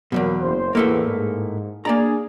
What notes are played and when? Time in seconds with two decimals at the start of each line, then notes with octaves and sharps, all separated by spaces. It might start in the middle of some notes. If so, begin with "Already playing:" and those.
0.12 E2 G2 B2 F#3 A#3
0.40 F#1 C5
0.75 E2 A2 A3 A#3
1.07 G#2
1.85 A#3 D4 G#4 D5 A#5